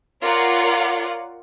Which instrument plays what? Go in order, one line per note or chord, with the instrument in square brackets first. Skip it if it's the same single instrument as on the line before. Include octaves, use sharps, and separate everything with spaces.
[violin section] F4 A#4 C#5 D5 F5 F#5